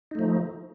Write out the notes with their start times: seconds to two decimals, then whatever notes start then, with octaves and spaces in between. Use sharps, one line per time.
0.11 D#4
0.15 A3
0.19 F3